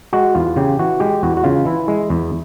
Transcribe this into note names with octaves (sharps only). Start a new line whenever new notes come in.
G#3 F#4
E2 F4
C#3 G4
E3 F#4
G#3 G4
E2 F#4
F#4
C#3 F4
E3 E4
G#3
E2